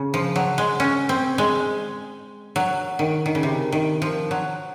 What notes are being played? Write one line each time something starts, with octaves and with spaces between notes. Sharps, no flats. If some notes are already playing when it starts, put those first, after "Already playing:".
Already playing: C#3
F3
F#3
G#3
C#4
C4
G#3
F#3
D#3
D#3
C#3
C3
D#3
F3
F#3